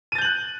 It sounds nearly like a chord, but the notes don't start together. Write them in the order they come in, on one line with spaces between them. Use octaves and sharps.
D#7 A6 G6 F#7 F#6